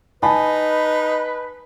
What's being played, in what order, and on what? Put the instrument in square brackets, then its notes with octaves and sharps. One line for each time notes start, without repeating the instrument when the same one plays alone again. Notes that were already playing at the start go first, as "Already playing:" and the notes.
[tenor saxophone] D#4 [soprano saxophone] B4 [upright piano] G#5 A5 B5